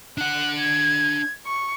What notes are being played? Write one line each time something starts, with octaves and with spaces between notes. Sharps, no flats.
D4 F#5 F#6
G#6
C#6